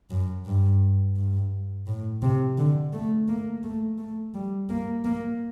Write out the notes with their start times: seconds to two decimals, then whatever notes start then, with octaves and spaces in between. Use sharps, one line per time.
0.11 F#2
0.46 G2
1.17 G2
1.87 A2
2.23 C3
2.58 D3
2.93 A3
3.28 A#3
3.64 A3
3.98 A3
4.34 G3
4.69 A#3
5.05 A#3